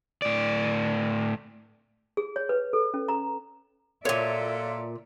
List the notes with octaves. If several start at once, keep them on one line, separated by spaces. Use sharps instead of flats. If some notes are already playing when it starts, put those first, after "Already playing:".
A2 D5
G#4
C#5
B4
A4
C#4
A#5
A#2 C#3 F#3 F4 A4 C#5 D5 E5